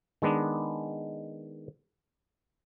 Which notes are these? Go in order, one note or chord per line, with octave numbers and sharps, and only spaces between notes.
D#3 G#3 B3 D4